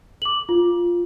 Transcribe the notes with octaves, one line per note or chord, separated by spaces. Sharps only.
D6 F#7
F4